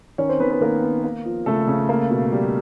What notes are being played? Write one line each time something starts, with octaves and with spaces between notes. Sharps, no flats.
D#3 C#4 C#5
C4 C5
D#3 B3 B4
B3 B4
D#3 A#3 A#4
B3
A#3
F3
C#3 A3 A4
C#3
A#3
B2
G3